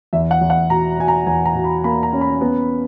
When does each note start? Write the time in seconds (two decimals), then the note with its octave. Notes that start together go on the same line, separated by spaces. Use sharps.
0.13 E2 E5
0.31 F#5
0.41 E2
0.50 F#5
0.69 B2 A#5
0.98 B2 G#5
1.08 A#5
1.27 E2 G#5
1.46 A#5
1.55 B2
1.64 B5
1.84 A#3 B5
2.03 A#5
2.13 C#4
2.21 B5
2.41 B3